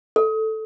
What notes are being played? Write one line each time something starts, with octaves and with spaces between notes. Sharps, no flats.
A4